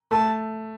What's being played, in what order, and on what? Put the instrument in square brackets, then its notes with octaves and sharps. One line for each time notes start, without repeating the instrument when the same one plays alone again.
[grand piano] A3 [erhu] A5